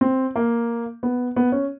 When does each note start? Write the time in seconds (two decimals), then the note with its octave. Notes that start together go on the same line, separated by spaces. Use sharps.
0.01 C4
0.36 A#3
1.03 B3
1.36 B3
1.52 C#4